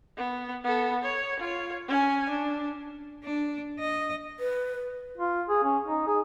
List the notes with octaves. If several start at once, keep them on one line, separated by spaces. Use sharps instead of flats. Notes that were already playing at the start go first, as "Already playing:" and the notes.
B3
B3 A4
C#5
F4 C#5
C#4 G#5
D4
D4
D#5
B4
F4
G#4
C#4
D#4
G#4